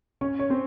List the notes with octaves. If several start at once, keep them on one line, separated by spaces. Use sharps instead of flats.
C#4 C#5
C#5
C4 C5